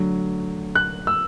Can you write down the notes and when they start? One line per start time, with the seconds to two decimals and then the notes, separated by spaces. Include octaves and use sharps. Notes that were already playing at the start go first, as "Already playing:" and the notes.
Already playing: D3 F#3 A3
0.75 F#6
1.07 E6